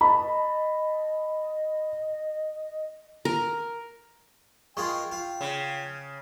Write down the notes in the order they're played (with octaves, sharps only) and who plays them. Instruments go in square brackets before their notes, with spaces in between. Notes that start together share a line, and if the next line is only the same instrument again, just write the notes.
[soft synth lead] D#5 [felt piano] A5 B5
[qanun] A#4
[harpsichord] G#3 F4 A#4 [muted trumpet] G5 [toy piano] C6 C#6
[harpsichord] F4
[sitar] C#3